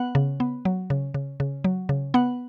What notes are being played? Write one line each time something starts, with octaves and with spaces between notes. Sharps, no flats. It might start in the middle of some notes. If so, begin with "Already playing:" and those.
Already playing: B3 F#5
C#3
B3
F#3
C#3
C#3
C#3
F#3
C#3
B3 F#5